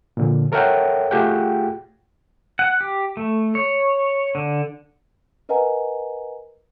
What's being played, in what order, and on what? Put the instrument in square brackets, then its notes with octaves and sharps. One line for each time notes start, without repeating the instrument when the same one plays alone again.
[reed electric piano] A#2 D3 F3
A4 A#4 C#5 E5 F#5 G5
A3 F4 G4 G#4 F#5 G5
[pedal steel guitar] F#5
G4
A3
C#5
D3
[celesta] A#4 B4 D#5 F#5 G#5 A#5